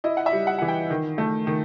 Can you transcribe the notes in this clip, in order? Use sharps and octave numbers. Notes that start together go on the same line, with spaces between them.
E4 D#5
F#5
E5
G3
F#5
E3 F#5
G5
D#3
A3
D#3